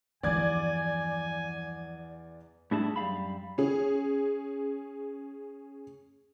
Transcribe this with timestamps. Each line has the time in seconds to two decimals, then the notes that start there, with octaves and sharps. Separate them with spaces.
0.23 E2 G2 F3 D5 G#5 D6 G#6
2.71 A2 G3 D4 E4 G#4 A5
2.96 F#2 G3 F5 B5
3.58 C#4 G#4